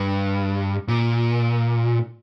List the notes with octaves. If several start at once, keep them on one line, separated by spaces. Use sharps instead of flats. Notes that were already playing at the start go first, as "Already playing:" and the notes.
Already playing: G2
A#2